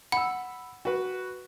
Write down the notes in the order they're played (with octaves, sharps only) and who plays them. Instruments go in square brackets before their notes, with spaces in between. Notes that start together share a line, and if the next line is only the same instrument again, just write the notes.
[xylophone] F#5 [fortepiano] B5 E6
[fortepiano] F#4 B4